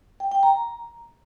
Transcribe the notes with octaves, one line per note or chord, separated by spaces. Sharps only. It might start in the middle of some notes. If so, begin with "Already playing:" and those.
G5
G5
A#5